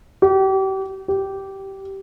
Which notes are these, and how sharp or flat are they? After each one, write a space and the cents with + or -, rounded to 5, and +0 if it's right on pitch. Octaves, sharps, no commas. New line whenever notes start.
G4 -35
G4 -15